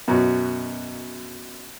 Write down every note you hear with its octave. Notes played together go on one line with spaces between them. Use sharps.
F#2 B2